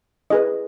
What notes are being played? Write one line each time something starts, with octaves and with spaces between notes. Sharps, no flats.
E4 G#4 B4 D#5